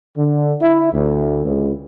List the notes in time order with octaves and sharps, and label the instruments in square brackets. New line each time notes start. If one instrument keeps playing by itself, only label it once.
[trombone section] D3
E4
D2
C#2